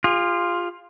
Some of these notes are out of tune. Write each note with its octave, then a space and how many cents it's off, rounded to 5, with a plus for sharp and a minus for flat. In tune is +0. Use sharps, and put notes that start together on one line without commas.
F4 +0 G#4 -45